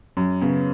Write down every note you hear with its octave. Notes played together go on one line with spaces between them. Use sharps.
F#2 C#4
C#3 B3